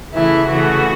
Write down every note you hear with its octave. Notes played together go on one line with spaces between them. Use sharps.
C#3 E3 A3 E4
C#3 E3 A3 F#4